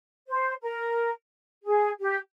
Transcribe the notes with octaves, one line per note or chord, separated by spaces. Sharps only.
C5
A#4
G#4
G4